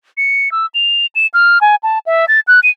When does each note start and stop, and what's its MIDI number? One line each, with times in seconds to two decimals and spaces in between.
0.17 0.51 97
0.52 0.66 88
0.74 1.06 101
1.15 1.27 100
1.34 1.61 89
1.61 1.75 80
1.83 1.99 81
2.06 2.25 76
2.28 2.40 93
2.47 2.60 90
2.63 2.70 99